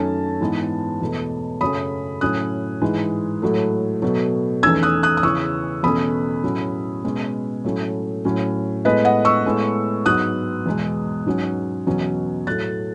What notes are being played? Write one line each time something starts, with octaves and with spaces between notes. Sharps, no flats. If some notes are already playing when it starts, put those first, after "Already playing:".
Already playing: F#2 D#3 A3 C#4 A5
G#2 E3 G#3 B3
E2 B2 A3
F#2 C#3 F#3 A3 C#4 B5 D#6
A2 F#3 C#4 D#6 F#6
G#2 E3 G#3
A2 F#3 A3
B2 F#3 A3
E2 D#3 A3 C#4 E6 G#6
D#6 F#6
D#6 F#6
D#6
E2 C#3 E3 C#6 E6
E2 B2 A3 C#4 B5 D#6
A2 F#3 A3 C#4
B2 G#3 C#4
A2 F#3 A3 C#4
A2 F#3 C#4
A2 G#3 B3 B4 D#5
D#5 F#5
C#6 E6
A2 G#3 B3
G#2 F#3 B3 D#6 F#6
E2 B2 G#3
G#2 F#3 C#4
E2 B2 F#3 C#4
A2 F#3 A3 F#6 A6